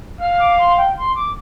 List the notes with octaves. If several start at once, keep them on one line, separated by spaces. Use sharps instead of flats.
F5 F6
F6
D6
C6
G5
C6
D6